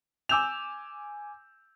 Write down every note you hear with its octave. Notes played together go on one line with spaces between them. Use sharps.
G#5 D6 E6 G6 E7 F7